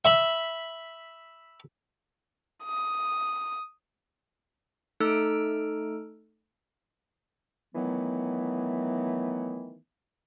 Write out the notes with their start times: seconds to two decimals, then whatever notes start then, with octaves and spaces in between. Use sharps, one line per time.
0.05 E5 B5
2.64 D#6
5.00 A3 D#4 A4 E6 F6 D7
7.75 D#3 E3 F#3 A3 B3